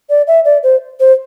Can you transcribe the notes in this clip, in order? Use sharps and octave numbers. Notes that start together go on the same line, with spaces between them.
D5
E5
D5
C5
C5